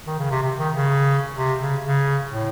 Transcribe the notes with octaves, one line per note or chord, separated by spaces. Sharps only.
D#3
C#3
C3
C3
D#3
C#3
C3
C#3
C#3
A2